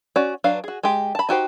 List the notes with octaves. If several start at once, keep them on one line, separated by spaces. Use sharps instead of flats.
C#4 F#4 D5
F#3 D4 B4 F5
F#4 G#4
G#3 G4
A5 B5
D#4 F#4 G4 C5